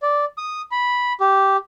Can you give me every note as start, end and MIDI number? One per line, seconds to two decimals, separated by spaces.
0.02 0.25 74
0.38 0.62 87
0.71 1.13 83
1.21 1.57 67